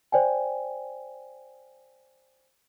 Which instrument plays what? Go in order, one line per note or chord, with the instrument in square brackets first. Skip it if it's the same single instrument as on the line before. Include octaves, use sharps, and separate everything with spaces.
[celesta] C5 D5 G5 G#5